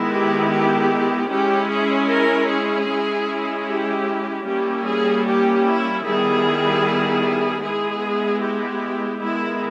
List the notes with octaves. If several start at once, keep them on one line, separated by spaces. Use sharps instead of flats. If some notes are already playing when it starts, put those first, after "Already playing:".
Already playing: D#3 G#3 B3 E4
G4
G4
G#3 C#4 E4 G4
G#4
A#4
G#4
G#3 C#4 E4
G4
G3 A#3 C#4 E4 G4
G#4
G4
E4
D#3 G3 B3 E4 G#4
G#3 B3 E4 G#4
G4
D#3 G#3 B3 E4